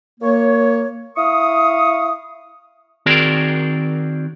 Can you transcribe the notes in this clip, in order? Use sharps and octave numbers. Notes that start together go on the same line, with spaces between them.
A#3 C#5
E4 F5 C#6 D#6
D#3 C4 F#4 G#4 A#4 D5